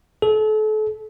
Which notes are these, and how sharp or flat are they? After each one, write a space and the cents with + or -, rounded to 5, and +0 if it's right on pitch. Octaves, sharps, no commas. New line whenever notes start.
A4 -35